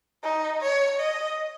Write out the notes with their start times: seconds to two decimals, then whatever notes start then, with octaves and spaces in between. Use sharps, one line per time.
0.23 D#4
0.62 C#5
1.00 D#5